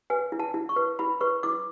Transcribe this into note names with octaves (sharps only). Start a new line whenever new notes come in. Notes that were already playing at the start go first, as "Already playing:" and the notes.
B4 G#5
E4
A5
E4
C#6
B4
E4 B5
B4 C#6
E4 D6